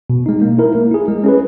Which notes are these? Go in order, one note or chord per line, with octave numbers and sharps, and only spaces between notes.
B2
G#3 D#4
A#3
E4 A#4
A#3
E4 G#4
G#3
C#4 G#4 B4